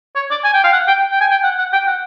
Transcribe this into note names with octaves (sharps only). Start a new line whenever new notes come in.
C#5
D5
G#5
G5
F5
F#5
G5
G5
G#5
G5
F#5
F#5
G5
F#5